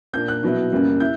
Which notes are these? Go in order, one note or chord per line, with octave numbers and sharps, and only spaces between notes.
A#2 A#3 D4 G6
F#6
B2 F#3 B3 E4
F#2 C#3 G3 A#3
E4 G6